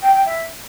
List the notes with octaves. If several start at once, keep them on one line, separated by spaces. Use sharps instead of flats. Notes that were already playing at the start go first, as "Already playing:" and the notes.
G5
G5
E5